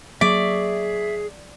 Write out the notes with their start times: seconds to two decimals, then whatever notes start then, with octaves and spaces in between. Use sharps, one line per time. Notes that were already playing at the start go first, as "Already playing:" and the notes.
0.21 F#3 A#3 G#4 D5 E5 C#6